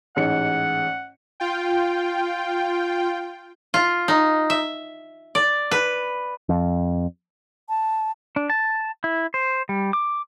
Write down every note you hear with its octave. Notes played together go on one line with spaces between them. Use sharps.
A1 G#2 F#5 C#7
F4 G5
F4
D#4
E5
D5
B4
F2
A5
D4
A5
E4
C5
G3
D6